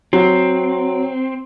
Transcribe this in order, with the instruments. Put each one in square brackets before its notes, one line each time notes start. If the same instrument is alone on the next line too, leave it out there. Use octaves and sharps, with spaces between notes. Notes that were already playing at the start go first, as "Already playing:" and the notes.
[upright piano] F#3 [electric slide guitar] C4